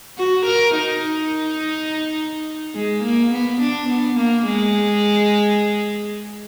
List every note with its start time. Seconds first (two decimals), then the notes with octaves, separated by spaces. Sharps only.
0.18 F#4
0.47 A#4
0.75 D#4
2.74 G#3
3.03 A#3
3.32 B3
3.61 D4
3.89 B3
4.18 A#3
4.46 G#3